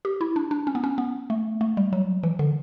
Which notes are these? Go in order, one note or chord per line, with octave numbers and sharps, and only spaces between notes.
G4
E4
D4
D4
C#4
B3
C#4
B3
A3
A3
G3
F#3
E3
D3